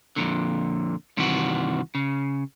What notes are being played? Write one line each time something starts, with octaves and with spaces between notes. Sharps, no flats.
F2 A#2 D3
G2 C3 D#3 E3 F#4
C#3